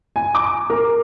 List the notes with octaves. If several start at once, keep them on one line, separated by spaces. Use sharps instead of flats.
G#5
D6
A#4